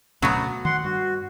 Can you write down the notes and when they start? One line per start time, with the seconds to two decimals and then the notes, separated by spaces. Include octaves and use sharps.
0.22 D2 B2 F#3 A3 B3 C#4
0.65 D#3 F#5 C6
0.84 G2 F#4